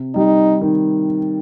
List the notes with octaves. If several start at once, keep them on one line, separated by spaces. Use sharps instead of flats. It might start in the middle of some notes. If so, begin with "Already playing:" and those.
Already playing: C3
G3 D#4
D#3